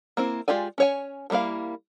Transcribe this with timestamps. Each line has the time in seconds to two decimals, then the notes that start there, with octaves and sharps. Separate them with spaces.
0.17 A#3 C4 E4
0.48 G#3 F4 G4 D5 G#5
0.78 C#4 C#5 G#5
1.30 F3 G3 A#3 E4 F5